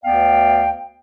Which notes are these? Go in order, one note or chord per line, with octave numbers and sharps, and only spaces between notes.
D2 B3 D5 F5 G5